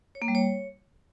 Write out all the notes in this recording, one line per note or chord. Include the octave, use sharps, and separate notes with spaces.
C#5
A#3
G3
C#5